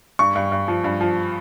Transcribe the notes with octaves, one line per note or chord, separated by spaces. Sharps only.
G2 C#6
G2
G2
F3
G2
F3